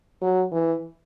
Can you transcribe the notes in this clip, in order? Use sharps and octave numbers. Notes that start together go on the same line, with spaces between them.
F#3
E3